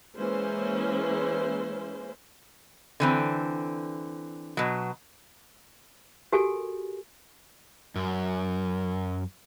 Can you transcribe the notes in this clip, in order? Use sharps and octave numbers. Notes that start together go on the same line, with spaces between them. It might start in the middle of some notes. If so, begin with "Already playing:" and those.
E3 G#3 A#3 C#4 C5
D3 E3 C4
B2 F#3
F#4 G4 A4 A#4 G#5
F#2